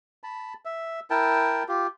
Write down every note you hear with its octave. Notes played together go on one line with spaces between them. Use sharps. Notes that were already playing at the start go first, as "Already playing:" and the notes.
A5 B5
E5
E4 A#4 G5 A5
F4 G4